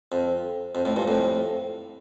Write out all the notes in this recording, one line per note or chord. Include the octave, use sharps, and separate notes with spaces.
F2
F2
F2 A2
G2 A#2
F2 A2